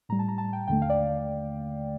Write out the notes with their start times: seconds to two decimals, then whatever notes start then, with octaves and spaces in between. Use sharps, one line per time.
0.09 A2 G3 A#5
0.19 A5
0.28 A#5
0.38 A5
0.53 G5
0.68 D#2 D3 A3 G5
0.82 F5
0.90 D5